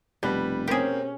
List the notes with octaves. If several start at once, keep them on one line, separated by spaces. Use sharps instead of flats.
F1 B2 G3 B4
A#3 C4 C#4 G4 G#4